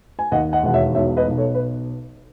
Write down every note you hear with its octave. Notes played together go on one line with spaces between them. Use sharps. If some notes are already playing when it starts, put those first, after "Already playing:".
G#5
D#2 D#5 F#5
D#5 F#5
E1 F#5
C#5 E5
B1 C#5 E5
B4 D#5
B1
A4 C#5
B4